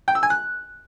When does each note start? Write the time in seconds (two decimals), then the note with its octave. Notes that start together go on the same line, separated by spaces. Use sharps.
0.08 G5
0.15 E6
0.23 G#5
0.30 F#6